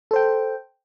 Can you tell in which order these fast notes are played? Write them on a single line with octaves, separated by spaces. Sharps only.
A4 C5 G5